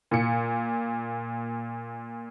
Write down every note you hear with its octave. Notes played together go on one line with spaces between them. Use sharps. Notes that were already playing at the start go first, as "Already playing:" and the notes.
A#2 C#7